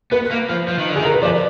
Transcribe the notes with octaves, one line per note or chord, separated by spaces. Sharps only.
B3 B4
A#3
F3
F3
D#3
D3
D#3 G#4
A#4
B4
F3 D5